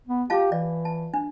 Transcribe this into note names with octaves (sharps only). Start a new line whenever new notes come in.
B3
F4 G4 F5 A5
E3 D5
A5
D4